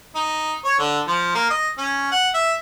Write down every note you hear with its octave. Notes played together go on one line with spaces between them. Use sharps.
D#4
C#5
D3
F3
A#3
D#5
C#4
F#5
E5